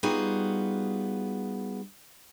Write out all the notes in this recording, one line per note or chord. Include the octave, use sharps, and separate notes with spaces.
G3 B3 D#4 F4 F#4 G#4